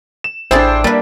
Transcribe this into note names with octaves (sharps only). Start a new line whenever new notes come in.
E7
A1 D4 E4 G#4 A4 C5 G5
G3 A#3 B4